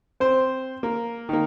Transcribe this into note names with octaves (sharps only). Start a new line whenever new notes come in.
C4 C5
A#3
D#3 A#3